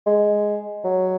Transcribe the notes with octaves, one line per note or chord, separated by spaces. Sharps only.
G#3
F#3